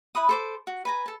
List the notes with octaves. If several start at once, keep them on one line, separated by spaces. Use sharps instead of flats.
E4 B4 B5 D#6
A4 C5 D6
F#4
B4 G#5 A#5
A4 A5